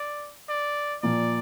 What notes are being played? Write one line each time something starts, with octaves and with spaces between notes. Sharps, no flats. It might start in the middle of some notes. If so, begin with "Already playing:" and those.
Already playing: D5
D5
A#2 F3 A#3 D5